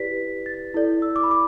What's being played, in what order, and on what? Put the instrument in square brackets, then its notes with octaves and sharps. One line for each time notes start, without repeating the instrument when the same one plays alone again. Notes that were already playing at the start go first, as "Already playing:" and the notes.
Already playing: [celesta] E4 G4 B4 D5 B6
A6
E4 A4 D5
E6
D6
B5
D6